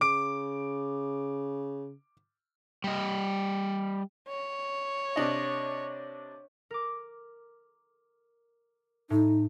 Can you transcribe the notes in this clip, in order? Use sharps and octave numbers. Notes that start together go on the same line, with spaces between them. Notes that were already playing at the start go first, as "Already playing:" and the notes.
C#3 D6 D7
G3 D#5
C#5
C3 D4 D#5
A#4 D6
A2 D#4